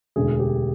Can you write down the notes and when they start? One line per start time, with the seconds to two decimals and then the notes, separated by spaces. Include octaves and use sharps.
0.16 E1 D2 D3 G#4
0.39 G4